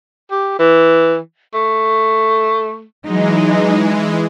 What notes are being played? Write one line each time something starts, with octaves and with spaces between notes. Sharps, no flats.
G4
E3
A3
E3 F#3 G#3 D#4